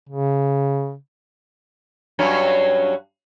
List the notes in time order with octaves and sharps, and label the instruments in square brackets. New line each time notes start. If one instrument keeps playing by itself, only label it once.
[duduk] C#3
[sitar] G2 F#3 C#4